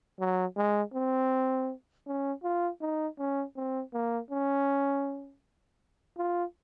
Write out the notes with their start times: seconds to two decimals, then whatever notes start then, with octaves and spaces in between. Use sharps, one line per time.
0.20 F#3
0.56 G#3
0.94 C4
2.07 C#4
2.44 F4
2.81 D#4
3.18 C#4
3.56 C4
3.93 A#3
4.31 C#4
6.18 F4